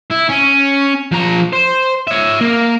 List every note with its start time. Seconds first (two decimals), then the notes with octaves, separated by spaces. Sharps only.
0.11 E4
0.30 C#4
1.13 F3 A#5
1.53 C5
2.08 C#5 E5
2.41 A#3